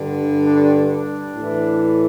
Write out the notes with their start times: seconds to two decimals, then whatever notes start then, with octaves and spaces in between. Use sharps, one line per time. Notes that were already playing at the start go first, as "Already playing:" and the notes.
Already playing: G2 D3
0.45 D4
0.91 D4
1.35 A2 E3